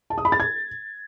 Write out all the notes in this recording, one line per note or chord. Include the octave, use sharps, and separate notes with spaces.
A5
D#6
B5
A6
G#6